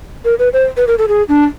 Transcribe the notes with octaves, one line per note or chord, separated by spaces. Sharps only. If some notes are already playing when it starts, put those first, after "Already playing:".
A#4
B4
C5
B4
A#4
A4
G#4
D4